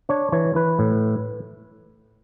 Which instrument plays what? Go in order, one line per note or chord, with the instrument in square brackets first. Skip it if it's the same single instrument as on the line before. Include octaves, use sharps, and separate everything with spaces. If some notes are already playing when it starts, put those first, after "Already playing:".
[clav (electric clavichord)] D4 C#5
E3 C#5
E3 B4
A2